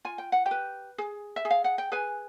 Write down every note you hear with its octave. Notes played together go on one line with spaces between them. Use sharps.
F4 G#5
G5
F#5
G4 G5
B4
G#4
E5
G#4
F5
F#5
G5
G#4 B4 G#5